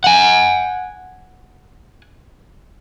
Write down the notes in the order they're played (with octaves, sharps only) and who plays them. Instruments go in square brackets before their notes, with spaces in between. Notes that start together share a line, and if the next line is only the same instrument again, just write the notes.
[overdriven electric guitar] F#5 G#5